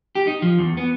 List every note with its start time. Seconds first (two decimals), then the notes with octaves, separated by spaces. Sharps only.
0.15 G4
0.27 D#4
0.42 F3
0.58 E2
0.77 B3